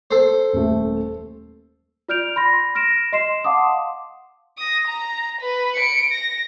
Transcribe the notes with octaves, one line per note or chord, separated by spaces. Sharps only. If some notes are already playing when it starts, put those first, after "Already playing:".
A4 C5
D#1 A3
F4 D5 F6 G6 D7 F7
B5 C6 A#6
F6 A#6 D7 E7
D#5 C6 C7 E7
F5 F#5 A5 C6 D6 D#6
D#6 A#6
A#5
B4
C#7 D7
A#6